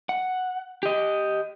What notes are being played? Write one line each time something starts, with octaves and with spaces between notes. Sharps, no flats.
F#5
G4 D#5